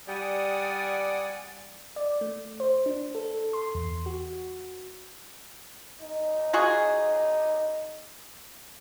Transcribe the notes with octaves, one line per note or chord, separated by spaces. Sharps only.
G3 D5 F#5 G#5 D#6
D5
A3
C5
D4
A4
C6
E2
F#4
D#4
F4 F#4 G#4